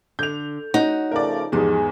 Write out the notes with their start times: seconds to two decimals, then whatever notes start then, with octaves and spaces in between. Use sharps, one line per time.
0.19 D3 G6 F7
0.74 D#4 F#4 C#5 F#5
1.11 C#3 F3 A3 A#4 D5
1.52 E2 G#2 F3 G4 G#4